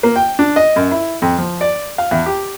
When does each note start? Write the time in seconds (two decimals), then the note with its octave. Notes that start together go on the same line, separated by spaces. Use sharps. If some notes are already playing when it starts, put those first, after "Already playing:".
0.03 A#3
0.16 G5
0.39 D4
0.56 D#5
0.76 F#2
0.91 E4
1.22 F2
1.38 F3
1.61 D5
1.98 F5
2.11 E2
2.26 G4